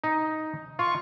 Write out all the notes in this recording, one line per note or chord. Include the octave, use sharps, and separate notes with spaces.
D#4
F4 C#6